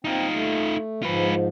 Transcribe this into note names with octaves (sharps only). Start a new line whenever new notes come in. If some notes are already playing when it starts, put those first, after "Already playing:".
C4 D#4 F4
A3
G#2 F3 F4 B4